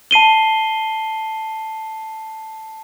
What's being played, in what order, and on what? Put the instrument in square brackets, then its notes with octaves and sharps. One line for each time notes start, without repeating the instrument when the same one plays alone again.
[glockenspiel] A5 C7 D#7 G7